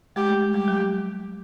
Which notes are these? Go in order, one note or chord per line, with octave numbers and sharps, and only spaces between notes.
G#3 G4
A3
G#3
G3 G4
F#3
G3